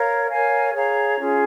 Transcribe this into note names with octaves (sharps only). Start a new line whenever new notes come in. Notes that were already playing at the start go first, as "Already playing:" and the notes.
Already playing: A#4 C#5 F5
A#4 C#5 F5 G#5
G#4 C#5 F5 A#5
C#4 F4 G#4